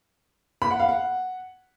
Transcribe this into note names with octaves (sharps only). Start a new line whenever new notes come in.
B5
F#5
F5
F#5